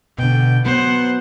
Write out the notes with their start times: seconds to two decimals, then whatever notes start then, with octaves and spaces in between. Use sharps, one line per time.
0.18 B2 D3 G5
0.65 F#3 B3 C5 F#5